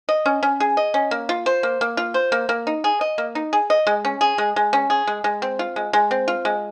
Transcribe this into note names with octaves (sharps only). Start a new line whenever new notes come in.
D#5
C#4
C#4
G#4
D#5
C#4
A#3
F4
C5
A#3
A#3
F4
C5
A#3
A#3
D#4
G#4
D#5
A#3
D#4
G#4
D#5
G#3
C#4
G#4
G#3
G#3
C#4
G#4
G#3
G#3
C4
F4
G#3
G#3
C4
F4
G#3